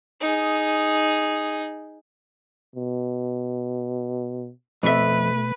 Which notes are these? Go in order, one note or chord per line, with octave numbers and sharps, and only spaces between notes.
D#4 G#4
B2
F2 B2 A3 B4 E5